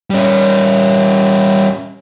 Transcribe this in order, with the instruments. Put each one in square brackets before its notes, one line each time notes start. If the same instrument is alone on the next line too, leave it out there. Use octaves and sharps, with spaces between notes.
[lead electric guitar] G3 C#4